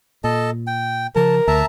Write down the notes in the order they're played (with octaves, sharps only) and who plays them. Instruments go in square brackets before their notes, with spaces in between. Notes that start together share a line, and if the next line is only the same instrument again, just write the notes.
[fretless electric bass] A#2 [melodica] A4 D#5 A5
[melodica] G5
[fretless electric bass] C#3 F3 [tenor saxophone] A#4 [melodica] A5
[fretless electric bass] D2 [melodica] E5 A5 A#5